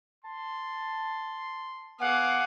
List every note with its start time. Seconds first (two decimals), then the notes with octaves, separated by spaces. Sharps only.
0.24 A5 C6
2.00 B3 G#4 F5 F#5 D6